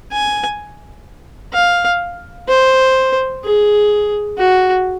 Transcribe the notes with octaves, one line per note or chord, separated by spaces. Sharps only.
G#5
F5
C5
G#4
F#4